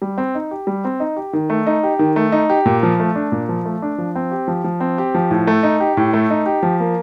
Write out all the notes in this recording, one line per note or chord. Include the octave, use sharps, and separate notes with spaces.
G3
C4
D#4
G4
G3
C4
D#4
G4
D#3
A3
D#4
G4
D#3
A3
D#4
G4
A#2
F3
A3
D4
A#2
F3
A3
D4
F3
C4
G4
F3
F3
C4
G4
F3
A2
A3
D#4
G4
A2
A3
D#4
G4
F3
A#3